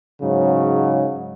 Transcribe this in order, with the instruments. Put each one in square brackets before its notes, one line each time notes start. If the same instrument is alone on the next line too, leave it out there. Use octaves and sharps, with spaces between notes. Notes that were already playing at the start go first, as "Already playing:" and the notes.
[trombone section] G#2 C#3 F#3